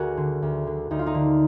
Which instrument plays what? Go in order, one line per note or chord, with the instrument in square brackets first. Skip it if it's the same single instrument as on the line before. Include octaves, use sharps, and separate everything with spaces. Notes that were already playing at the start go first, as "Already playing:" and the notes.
Already playing: [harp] D2 F#4 G#4 A#4
D3
D2
D3
D2 D#4
F4
D#4
D3